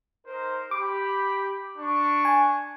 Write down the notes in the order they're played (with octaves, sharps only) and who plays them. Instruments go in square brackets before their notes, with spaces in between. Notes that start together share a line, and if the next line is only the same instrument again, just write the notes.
[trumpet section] D#4 A#4 C5
[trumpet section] G4 B5 [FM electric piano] D6
[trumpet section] D4 C#6
[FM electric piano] G#5